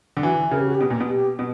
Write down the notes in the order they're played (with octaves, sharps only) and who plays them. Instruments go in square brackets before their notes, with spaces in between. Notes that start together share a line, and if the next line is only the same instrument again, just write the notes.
[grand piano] D3
[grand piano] E3 [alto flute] F#4
[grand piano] C#3 [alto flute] A#4
[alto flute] G4
F#4
G4
[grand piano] B2
A#2
B2
[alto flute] G4
[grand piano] B2